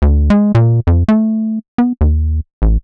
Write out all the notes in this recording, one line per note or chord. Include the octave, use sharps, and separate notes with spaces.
D2
G#3
A#2
F2
A3
B3
D#2
A1